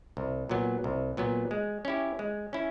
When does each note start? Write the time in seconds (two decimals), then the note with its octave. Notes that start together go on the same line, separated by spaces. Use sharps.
0.17 C2
0.49 A#2 F#3 B3
0.84 C2
1.17 A#2 F#3 B3
1.51 G#3
1.85 C#4 E4 G4
2.19 G#3
2.53 C#4 E4